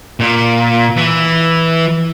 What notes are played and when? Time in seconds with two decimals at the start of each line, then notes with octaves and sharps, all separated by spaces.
0.20 A#2
0.96 E3